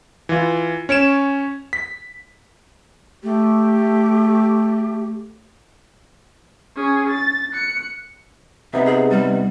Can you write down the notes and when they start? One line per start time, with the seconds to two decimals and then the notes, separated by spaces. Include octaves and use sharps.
0.29 E3 F4
0.89 C#4 C#5 D7 E7
1.73 B6
3.24 A3 G4
6.76 C#4 G#4
7.10 A6
7.53 F#6 C#7
8.74 C3 B3 D#4 E5
8.86 G#4
9.10 G3